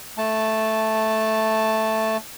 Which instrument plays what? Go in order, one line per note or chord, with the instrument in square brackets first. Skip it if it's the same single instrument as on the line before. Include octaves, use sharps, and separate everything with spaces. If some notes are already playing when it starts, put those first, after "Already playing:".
[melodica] A3 A5